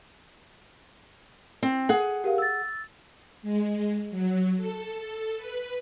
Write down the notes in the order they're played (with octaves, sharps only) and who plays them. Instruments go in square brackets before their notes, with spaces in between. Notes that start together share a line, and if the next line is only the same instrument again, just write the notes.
[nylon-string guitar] C4
G#4 F#5
[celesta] G4 A#4 F5
E6 A6
[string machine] G#3
F#3
A4
B4